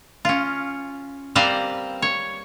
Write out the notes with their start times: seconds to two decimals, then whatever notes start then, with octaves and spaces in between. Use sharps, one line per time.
0.25 C#4 F4
1.35 G3 A#3 C4 B4 C5 F5
2.02 C#5